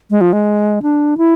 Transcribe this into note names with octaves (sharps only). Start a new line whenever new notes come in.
G#3
F3
G#3
D4
E4